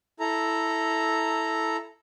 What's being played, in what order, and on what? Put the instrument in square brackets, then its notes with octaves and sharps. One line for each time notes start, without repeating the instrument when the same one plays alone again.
[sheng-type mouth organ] E4 A4 A#5